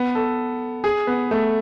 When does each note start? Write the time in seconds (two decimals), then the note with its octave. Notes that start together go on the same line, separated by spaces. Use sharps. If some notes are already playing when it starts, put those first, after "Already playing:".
Already playing: B3
0.15 A4
0.84 G#4
1.07 B3
1.31 A3